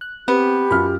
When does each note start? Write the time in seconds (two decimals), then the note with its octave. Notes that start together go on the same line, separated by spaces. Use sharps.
0.01 F#6
0.28 B3 C4 G4
0.71 F#2 F4 B5 F6